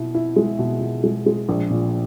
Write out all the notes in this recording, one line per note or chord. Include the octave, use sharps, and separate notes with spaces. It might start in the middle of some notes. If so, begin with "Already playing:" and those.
Already playing: B2 E4
E4
G#3
B2
B2
G#3
G#3
A#1
A#2